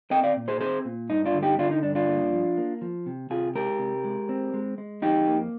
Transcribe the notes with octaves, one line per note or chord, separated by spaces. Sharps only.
C4 D#5 G5
D5 F5
A#2
G#4 C5
C4 G#4 C5
A#2
G2 D#4
D4 F4
D3
D#4 G4
D3 D4 F4
D#4
G2 D4
D4 F4
A#3
F3
A#3
F3
C3
C3 F4 G#4
G#3 G4 A#4
C3
G#3
C4
G#3
G#3
F2 D#4 G4
A#3